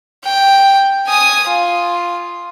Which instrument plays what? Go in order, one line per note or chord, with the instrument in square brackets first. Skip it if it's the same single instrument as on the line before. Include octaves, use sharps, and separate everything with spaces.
[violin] G5
G#5 D#6
F4